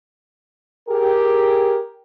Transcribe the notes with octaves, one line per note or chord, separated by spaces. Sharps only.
G4 G#4 A#4